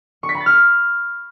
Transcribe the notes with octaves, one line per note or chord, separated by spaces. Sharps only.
C#6
B6
B5
A6
F6